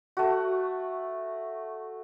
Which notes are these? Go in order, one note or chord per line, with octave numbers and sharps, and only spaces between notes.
A3 F#4